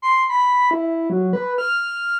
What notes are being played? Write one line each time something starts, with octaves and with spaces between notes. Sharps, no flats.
C6
B5
E4
F#3
B4
F6